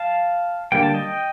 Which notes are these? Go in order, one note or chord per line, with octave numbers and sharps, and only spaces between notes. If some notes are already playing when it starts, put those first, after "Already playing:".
Already playing: F5 A5
D3 G3 A#3 G5
A5
D#5 G5